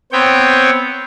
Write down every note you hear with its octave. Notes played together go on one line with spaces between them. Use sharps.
B3 C4 C#5 G5